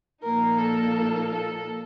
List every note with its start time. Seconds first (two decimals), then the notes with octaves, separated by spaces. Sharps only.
0.23 A#2 F3 A#3 D#4 A#4
0.58 A4
1.31 A4